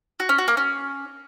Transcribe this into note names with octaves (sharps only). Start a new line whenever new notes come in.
F#4
C#4
F#4
A#3
C#4